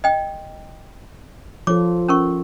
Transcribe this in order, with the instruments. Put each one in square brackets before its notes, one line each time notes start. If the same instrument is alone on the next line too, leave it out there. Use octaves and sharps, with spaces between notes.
[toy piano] D#5 G5
[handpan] F3 F4 A4 [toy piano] C#5 D6
[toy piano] C#4 A#4 C#6